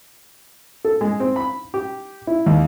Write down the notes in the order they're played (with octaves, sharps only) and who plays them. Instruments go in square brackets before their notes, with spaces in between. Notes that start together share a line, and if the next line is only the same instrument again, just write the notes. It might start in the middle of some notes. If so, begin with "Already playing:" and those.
[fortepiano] A4
G#3
C4
B5
G4
E4
D#2